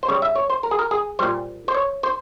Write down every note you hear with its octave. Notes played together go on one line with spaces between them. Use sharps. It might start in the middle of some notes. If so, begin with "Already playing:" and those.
C5
C#3 G3 C#5
E5
C#5
C5
A#4
G#4
A#4
G#4
A#2 G3 C5
C5
C#5
C5